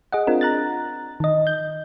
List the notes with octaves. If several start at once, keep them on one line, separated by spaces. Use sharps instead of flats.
G#4 D#5 F#5
C4 D4 F4 A#4
A#5 F#6 A6
D#3 D#5
G6